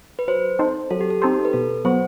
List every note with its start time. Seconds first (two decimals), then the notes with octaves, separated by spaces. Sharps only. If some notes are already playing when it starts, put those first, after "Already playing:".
0.19 B4
0.28 F#3 C5
0.59 C4 D#4 A4 C5
0.91 F#3 A4
1.01 G4
1.10 A4
1.22 C4 D#4 G4 A4 C5
1.45 B4
1.53 B2 A4
1.85 F#3 B3 F#4 C5